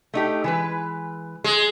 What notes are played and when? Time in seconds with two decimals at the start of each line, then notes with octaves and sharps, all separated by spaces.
0.14 A3 D#4 G4
0.44 E3 G#3 B4
1.44 G#3